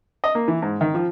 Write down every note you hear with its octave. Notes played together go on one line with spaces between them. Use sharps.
D#5
A#3
E3
G#2
D#3
F3